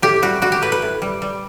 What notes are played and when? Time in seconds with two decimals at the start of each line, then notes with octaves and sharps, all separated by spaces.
0.02 A2 G4
0.22 G3 F#4
0.42 G3 F#4
0.52 G4
0.62 A2 B4
0.72 B4
0.82 A2
1.02 G3
1.22 G3